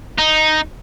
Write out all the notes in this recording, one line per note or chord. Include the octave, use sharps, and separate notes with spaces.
D#4